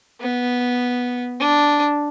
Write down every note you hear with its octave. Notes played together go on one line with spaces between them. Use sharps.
B3
D4